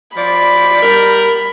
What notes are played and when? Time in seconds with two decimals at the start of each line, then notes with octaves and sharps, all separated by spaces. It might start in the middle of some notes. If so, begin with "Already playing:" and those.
0.17 F3 D5 B5
0.82 G3 A#4